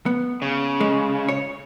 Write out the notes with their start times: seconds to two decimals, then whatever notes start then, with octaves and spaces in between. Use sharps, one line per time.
0.06 B3
0.42 C#3
0.81 G#3
1.28 C#5